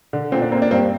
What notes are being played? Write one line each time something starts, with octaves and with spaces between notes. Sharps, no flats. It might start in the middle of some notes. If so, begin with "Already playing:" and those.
D3
A#2 C4
D4
A#3 C4
D4
G2 C4